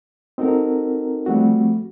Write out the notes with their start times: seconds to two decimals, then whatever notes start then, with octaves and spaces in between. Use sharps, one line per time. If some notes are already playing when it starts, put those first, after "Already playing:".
0.38 C4 D#4 F#4 A4 A#4
1.26 F3 G3 A3 C4 F#4